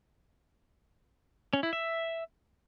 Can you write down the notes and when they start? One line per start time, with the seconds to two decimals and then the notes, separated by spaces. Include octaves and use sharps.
1.53 C#4
1.63 E4
1.73 E5